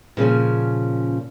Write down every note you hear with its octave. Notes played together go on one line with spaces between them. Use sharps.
A#2 C#3 F3 C#4